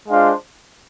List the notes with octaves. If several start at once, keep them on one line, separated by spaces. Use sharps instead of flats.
G#3 D4 F4 C5 F5